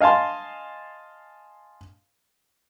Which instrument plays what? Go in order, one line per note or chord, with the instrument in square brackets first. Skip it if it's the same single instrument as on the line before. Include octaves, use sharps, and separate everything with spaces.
[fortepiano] D#5 F5 G#5 A5 C6